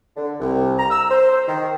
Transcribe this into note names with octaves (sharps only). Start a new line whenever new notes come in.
D3
C2
A#5
E6
C5
D#3